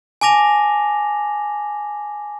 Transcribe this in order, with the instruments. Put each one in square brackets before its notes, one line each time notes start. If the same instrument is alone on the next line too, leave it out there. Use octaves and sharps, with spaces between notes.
[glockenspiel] G#5 A5 D6 A#6 F7